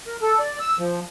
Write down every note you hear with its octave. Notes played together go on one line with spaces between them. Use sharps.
A#4
A4
D5
E6
F3